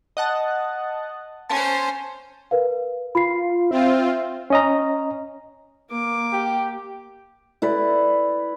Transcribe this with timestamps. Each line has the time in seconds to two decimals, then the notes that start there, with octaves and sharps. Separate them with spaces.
0.17 D#5 F#5 A5
1.50 C#4 C5 A5 C6
2.51 A#4 B4 F5
3.15 F4 B5 C7
3.71 C4 F4 E5
4.50 C#4 D#5 A#5
5.90 A#3 D6
6.33 G4
7.62 E4 B4 D5